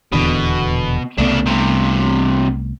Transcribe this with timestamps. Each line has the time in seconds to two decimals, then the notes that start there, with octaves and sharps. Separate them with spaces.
0.13 D#1 E2 B2 D3
1.18 C2 C#3 A3 B3 D4
1.46 G2 C3